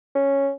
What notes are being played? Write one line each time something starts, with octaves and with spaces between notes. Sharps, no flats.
C#4